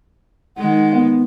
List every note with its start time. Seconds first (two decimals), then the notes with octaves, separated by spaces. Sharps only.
0.57 D#3 G#3 F#5
0.94 B3